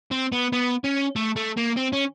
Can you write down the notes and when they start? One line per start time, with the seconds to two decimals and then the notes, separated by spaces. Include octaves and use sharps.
0.11 C4
0.32 B3
0.53 B3
0.84 C#4
1.16 A3
1.36 A3
1.57 A#3
1.77 C4
1.93 C#4